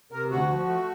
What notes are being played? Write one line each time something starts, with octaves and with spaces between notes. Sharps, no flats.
C3 A#4
D2 F#4
F3
A3